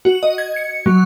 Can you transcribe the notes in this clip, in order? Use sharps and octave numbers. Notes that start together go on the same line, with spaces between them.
F#4
D#5
G#6
C#7
F#3